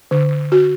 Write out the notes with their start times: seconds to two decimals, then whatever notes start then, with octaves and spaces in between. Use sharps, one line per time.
0.11 D3
0.52 F#4